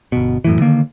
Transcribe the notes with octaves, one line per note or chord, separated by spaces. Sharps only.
G1 B2
F#2 A2 E3
D3 D#3 A#3